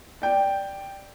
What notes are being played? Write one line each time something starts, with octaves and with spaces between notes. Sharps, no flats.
D5 G5